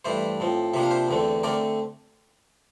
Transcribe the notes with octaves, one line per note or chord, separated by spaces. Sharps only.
G2 E3 A3 D4 C5 E5
A2 F3 C4
C3 F3 A#3 D4 E5
F5
C5 E5
E2 D3 A3 C4
D3 A3 C4 A#4 D5